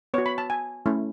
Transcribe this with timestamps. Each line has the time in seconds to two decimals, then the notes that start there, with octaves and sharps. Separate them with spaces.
0.14 B3 C#5
0.18 F#4
0.26 B5
0.38 A5
0.50 G#5
0.86 A3 C#4 E4